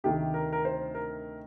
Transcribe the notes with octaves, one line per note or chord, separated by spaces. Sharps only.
D2 C3 D#3 A3 G4
A#4
A#4
C5
A#4